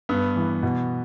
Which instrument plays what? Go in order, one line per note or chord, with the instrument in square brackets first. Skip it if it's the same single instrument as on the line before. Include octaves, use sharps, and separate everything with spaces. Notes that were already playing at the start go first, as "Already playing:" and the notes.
[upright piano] G2 [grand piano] B3
[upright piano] E3
B2